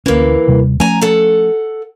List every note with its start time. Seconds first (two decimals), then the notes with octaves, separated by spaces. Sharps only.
0.06 D2 E3 A#3 C#4
0.47 D#2 C3 G3
0.80 F3 A3 C#4 G#5 A#5
1.01 A4 F#5